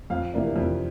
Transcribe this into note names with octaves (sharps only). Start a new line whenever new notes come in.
F2 F5
C3 E3 A#3 D4
F2